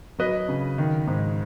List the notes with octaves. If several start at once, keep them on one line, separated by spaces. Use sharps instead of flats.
F#3 B4 D#5
C#3
D#3
G#2